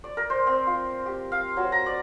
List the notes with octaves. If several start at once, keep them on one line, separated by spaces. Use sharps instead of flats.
D5
A#4
C5
C4
F4
G4
F5
F#3
A#5
D5